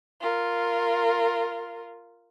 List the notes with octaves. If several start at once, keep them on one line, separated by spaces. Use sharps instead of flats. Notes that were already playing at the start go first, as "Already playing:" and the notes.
F4 A#4